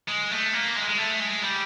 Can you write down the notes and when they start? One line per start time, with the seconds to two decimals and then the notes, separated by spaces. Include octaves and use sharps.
0.08 G#3
0.31 A3
0.54 A#3
0.76 G#3
0.89 G#3
0.99 A3
1.21 G#3
1.43 G3